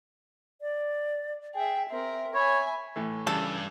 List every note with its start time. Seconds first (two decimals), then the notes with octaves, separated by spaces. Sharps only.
0.61 D5
1.54 G#4 E5 G5
1.89 C4 A#4 E5
2.34 C#5 E5 G#5 B5
2.96 A2 E3 A3
3.27 G2 C#3 E3 G3 A4